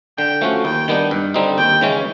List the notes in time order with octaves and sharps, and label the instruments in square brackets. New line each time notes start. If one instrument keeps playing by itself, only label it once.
[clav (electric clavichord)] D3 [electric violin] G5
[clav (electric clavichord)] F3 A3 C#4 F#4
[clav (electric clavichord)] D#2 [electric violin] G5
[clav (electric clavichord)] D#3 G3 B3 D4
G2
D3 G3 C4 D#4
[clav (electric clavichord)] D#2 [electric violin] G5
[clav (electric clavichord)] C#3 E3 G#3 C#4